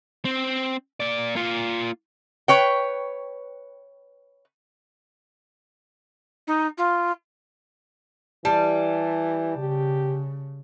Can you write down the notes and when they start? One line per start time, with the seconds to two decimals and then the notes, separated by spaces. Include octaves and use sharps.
0.25 C4
1.00 A#3 D5
1.35 A#3 F4
2.48 B4 C#5 G5
6.47 D#4
6.77 F4
8.45 E3 G3 A5
9.58 C#3 G4